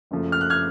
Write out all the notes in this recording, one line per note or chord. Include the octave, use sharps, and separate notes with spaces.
F#1 F#2 F3 A3
F6
F#6
F6 G#6